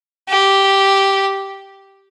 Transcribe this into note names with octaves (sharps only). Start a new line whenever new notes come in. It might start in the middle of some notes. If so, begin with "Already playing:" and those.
G4